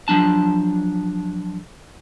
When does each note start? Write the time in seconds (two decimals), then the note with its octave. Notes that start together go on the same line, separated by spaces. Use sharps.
0.08 F3 F#3 D4 A5